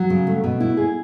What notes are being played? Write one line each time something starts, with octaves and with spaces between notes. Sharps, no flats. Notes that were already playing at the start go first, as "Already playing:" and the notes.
Already playing: F#3
C#3
A3
B2
E4
G#4